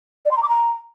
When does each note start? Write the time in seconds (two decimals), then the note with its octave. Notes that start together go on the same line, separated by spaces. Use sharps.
0.25 D5
0.31 C6
0.37 A#5
0.42 D6
0.48 A#5